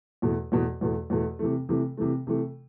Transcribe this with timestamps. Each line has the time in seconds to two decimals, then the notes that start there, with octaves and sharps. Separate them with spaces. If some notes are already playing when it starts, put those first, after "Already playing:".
0.22 E2 B2 A3
0.52 E2 B2 A3
0.81 E2 B2 A3
1.10 E2 B2 A3
1.39 C3 E3 A3
1.69 C3 E3 A3
1.97 C3 E3 A3
2.27 C3 E3 A3